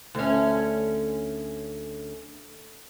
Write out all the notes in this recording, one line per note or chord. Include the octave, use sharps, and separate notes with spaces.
D2 C#4